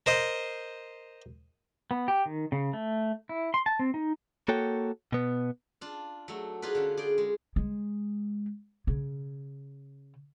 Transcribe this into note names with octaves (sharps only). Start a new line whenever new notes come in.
A#4 C5 D#5
B3
G4
D#3
C#3
A3
E4
C6
A5
C4
D#4
A#3 F#4 A4 C#5 G5
B2 B3
D4 F4
F#3 A3
D4 D#4 F4 G#4 B4
D3 C#4
G#4 D5 G5
G#3
G#3
C#3